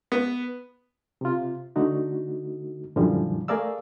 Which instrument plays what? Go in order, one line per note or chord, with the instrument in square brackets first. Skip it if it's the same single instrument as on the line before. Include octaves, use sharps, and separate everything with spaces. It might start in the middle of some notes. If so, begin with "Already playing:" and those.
[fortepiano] B3
[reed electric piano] C3 F4
D3 A3 D#4 F#4
F#2 A#2 D3 E3 F3 G3
A3 G#4 A#4 D5 F5 E6